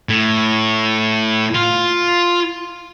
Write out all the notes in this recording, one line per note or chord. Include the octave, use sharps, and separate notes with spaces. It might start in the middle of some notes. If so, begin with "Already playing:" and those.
A2
F4